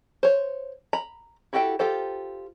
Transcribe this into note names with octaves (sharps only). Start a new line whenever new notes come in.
C5 C#5
A#5 B5
E4 F#4 G4 A4 G5
F4 G4 A4 C5